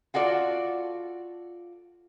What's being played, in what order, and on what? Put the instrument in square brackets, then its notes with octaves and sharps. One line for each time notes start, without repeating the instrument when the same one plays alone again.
[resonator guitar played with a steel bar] F4 F#4 A4 D5